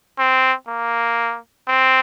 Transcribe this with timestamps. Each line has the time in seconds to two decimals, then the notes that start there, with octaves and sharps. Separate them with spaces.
0.19 C4
0.69 A#3
1.68 C4